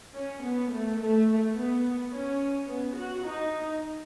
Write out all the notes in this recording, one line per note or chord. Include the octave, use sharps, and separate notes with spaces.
C#4
B3
A3
A3
B3
C#4
B3
F#4
D#4